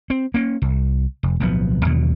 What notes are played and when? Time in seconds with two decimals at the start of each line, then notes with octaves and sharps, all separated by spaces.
0.10 C4
0.34 A#3 C#4
0.62 C2
1.23 F1
1.40 D1 B1 F3 B3
1.85 D#2 B2 D3 F#3